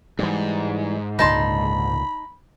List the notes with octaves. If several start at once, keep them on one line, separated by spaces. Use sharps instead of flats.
G#2 E3 G3
C#2 A#2 D3 D#4 A5 B5 C6